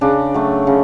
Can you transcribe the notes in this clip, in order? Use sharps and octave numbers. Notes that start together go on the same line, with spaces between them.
C#3 D4
F#3 A3
C#3